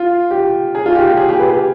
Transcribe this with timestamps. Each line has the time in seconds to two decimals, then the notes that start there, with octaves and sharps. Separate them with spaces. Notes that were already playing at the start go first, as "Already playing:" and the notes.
Already playing: F4
0.31 G4
0.75 G#4
0.86 F4
0.95 G4
1.07 G4
1.17 G#4
1.29 G4
1.39 B4
1.49 G4